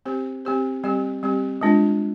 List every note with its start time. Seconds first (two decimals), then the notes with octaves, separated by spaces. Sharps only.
0.05 C4 G4 C5
0.45 C4 G4 C5
0.84 G3 C4 G4
1.23 G3 C4 G4
1.61 G#3 D4 F4